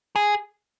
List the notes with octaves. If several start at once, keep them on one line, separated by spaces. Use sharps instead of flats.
G#4